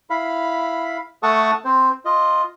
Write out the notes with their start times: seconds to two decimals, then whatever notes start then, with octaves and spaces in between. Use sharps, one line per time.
0.10 E4 F5 B5
1.23 A3 A4 F#5 A5 C#6 D#6
1.65 C4 C5
2.05 F4 D#5